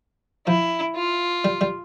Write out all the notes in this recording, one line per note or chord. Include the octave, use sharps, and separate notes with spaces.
F3 E4
F4
G3
G3